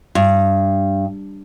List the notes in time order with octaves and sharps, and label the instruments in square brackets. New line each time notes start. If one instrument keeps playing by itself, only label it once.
[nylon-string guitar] G2